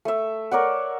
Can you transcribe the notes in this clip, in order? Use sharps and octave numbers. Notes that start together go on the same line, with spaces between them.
A3 E5
A#4 C#5 D5 F#5